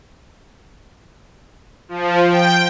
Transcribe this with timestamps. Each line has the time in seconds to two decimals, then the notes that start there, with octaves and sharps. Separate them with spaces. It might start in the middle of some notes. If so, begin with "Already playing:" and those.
1.89 F3
2.28 G5